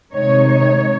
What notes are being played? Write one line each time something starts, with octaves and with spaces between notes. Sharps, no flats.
C3 D#3 G#3 D#4 C#5
C#5